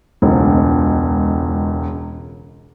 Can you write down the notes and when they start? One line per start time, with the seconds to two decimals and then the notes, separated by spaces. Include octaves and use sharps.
0.22 E1 C#2